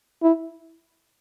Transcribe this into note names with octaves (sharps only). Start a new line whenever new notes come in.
E4